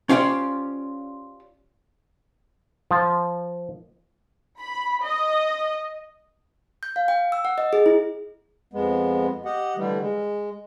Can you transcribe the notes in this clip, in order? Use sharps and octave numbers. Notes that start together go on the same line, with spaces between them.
C#4 F4 G4 C5 D5
F3
B5
D#5
G6
F5
G5
E6
F#5
D#5
G#4
E4
F2 G#3 B3
G4 D#5 F#5
D3 E3 G3 A3
G#3